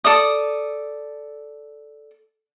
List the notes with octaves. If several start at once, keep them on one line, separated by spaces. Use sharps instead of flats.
A4 D5 D#6